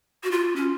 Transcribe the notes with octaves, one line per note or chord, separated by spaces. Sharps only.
F#4
F4
C#4